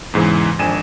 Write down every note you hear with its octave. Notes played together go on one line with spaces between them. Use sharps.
E2 G#2 C#3 E3
G#1 F2 D4 G#5 D#7 E7